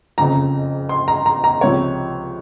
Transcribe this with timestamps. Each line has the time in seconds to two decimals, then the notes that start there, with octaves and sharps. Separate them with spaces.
0.18 F#1 F2 C#3 F3 A#5
0.89 C6
1.08 A#5
1.26 A#5
1.44 A#5
1.61 C#2 C3 F3 C#5